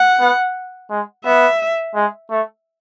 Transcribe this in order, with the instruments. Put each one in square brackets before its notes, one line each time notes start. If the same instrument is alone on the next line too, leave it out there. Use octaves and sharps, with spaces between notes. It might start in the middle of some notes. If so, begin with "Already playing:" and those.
Already playing: [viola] F#5
[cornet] B3
G#3
[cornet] B3 [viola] E5
[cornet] G#3
A3